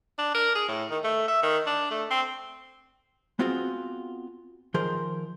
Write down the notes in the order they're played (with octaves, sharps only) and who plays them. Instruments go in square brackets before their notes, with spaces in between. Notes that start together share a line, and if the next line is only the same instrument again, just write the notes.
[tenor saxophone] D4
A#4
G#4
A2
D#3
A3
E5
D#3
D4
A3
C4
[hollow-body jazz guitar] B3 C4 F4 F#4 G#4
D#3 F3 G#4 A#4 C5